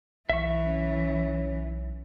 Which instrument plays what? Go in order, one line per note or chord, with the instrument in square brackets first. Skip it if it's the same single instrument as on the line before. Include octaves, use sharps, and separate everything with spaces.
[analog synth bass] B1 [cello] E3 [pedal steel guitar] E5 C#6
[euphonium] C#4